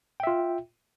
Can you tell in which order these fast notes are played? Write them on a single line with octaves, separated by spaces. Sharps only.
G5 E5 F4